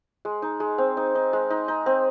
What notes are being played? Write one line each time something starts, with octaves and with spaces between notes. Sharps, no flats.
G#3
D#4
G#3
C4
D#4
D#4
G#3
D#4
D#4
C4